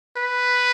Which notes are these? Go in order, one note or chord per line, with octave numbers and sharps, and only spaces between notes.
B4